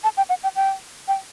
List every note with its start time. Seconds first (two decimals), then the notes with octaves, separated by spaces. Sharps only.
0.04 A5
0.17 G5
0.29 F#5
0.43 G5
0.56 G5
1.08 G5